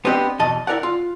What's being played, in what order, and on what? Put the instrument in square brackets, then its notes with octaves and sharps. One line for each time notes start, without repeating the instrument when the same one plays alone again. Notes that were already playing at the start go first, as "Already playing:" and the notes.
[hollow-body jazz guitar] B3 C4 D4 G4 D#5
E2 B2 D#5 A5
E4 A#4 D5 F#5
F4